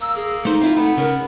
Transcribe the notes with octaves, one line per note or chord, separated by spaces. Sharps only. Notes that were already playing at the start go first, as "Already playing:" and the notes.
A#3 E6
G#4
A3 D#4 C5
C4 E4 F4
A3 B3 B5
C#3 A#4